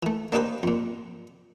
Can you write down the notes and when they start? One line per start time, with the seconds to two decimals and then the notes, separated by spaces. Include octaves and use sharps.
0.03 E3 A3
0.32 A#3 D4 D#4 G4 B4 C5
0.63 F2 A#2